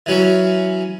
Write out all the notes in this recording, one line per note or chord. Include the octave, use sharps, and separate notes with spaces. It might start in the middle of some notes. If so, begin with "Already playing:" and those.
E3 F#3 C#4